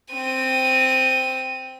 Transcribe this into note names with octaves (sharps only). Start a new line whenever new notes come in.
C4 D#7